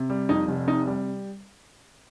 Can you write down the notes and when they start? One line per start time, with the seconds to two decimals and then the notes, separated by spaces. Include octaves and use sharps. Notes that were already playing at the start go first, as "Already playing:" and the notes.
Already playing: C3
0.10 G3
0.29 F2 D#4
0.48 F1
0.67 C3 D#4
0.87 G3